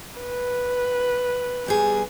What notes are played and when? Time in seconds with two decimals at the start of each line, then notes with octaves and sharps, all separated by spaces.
0.20 B4
1.66 E2 G3 G#4